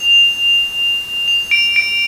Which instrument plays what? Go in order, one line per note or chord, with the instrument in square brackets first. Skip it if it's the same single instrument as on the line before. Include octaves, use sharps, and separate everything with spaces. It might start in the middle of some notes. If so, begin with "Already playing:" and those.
Already playing: [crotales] F7
F7
D7
D7